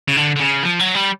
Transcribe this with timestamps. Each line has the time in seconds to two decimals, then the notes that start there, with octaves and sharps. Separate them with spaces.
0.08 C#3
0.17 D3
0.36 D3
0.40 C#3
0.63 F3
0.79 F#3
0.94 G3